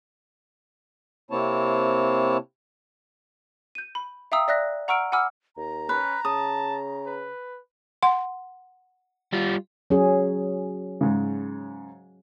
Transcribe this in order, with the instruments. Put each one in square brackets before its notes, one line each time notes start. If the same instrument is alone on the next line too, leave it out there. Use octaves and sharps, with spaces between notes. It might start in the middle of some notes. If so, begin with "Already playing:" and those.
[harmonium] C3 A#3 C4 E4 C#5 A5
[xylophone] G6 D#7
B5
E5 F5 G5 A#5 D#6 E6
D5 E5 F#6 A#6
F#5 A#5 C#6 E6 F6 D7
F#5 G#5 B5 D6 E6 F6
[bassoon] D#2 [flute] A#5
[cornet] C#4 [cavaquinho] B4
[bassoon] C#3 [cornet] A5 [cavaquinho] D#6
[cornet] B4
[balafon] F#5 C6
[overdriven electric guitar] G3 F4
[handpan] F#3 C#4 G#4
[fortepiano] G#2 C#3